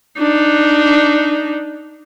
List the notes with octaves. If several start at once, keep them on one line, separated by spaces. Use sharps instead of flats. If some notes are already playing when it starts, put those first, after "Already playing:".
D4 D#4